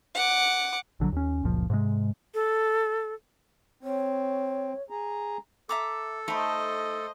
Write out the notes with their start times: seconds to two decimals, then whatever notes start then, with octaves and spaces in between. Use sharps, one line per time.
0.15 F#5 D6
1.00 A#1 D3 D#3 F#3
1.12 D#2 C#4
1.44 F#1 C#2 A#2 F3
1.70 G#2 C3 G#3
2.34 A4
3.83 C4 C#5
4.90 G#4 A#5
5.69 A4 E5 A#5 D6
6.28 A3 D#4 C5 D#5 B5